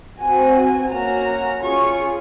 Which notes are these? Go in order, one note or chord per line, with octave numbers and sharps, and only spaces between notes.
C4 F#4 G#5
A#3 C#4 F#4 A#5
C#4 F4 G#4 C#6